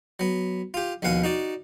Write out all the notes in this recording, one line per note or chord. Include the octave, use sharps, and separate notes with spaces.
F#3 B3
F4 G4
A#1 D#2 B2 F5 F#5 G#5
D#4 F#4 D5